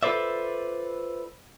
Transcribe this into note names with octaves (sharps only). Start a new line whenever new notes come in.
F4 A4 B4 C5 D5 E5